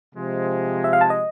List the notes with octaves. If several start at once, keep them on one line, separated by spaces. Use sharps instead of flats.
C3 F3 G#3
E5
F5
A5
D#5